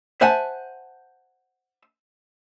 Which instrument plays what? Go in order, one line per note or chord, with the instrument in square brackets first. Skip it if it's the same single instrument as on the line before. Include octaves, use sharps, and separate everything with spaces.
[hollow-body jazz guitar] C5 E5 F#5 G#5 A5